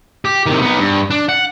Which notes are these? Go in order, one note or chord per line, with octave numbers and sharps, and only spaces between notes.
G4
C3 D#3
B3 D#4
G2
D4
F#5